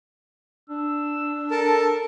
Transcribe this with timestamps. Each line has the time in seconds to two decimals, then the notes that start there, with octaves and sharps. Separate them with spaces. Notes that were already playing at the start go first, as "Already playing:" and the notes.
0.70 D4 E6
1.51 A4 A#4 A5